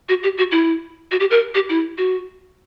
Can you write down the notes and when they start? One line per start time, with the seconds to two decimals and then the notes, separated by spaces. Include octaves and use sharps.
0.09 F#4
0.23 G4
0.38 F#4
0.52 E4
1.11 F#4
1.20 G4
1.31 A#4
1.55 G4
1.69 E4
1.98 F#4